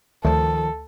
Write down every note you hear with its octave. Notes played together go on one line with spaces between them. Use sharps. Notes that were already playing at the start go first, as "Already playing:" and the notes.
D2 D#3 F3 A4